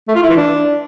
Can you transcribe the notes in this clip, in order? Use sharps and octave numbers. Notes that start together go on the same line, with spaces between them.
A3
F4
E4
E3
D4